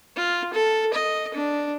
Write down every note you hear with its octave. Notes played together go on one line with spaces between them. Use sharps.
F4
A4
D#5
D4